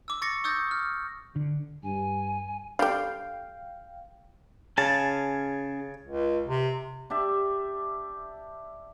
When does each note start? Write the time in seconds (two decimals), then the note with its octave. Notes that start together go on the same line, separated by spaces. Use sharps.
0.08 D6 E6
0.22 C#6 D6 A6 A#6 C#7
0.44 C#6 D#6 E6 G6 A6 A#6
0.71 F6
1.36 D3
1.83 G2 G#5
2.79 G3 D4 G4 A4 F5 G5
4.78 C#3 C#4 G#4 A5
6.05 C#2
6.47 C3
7.10 D4 G4 D5 E5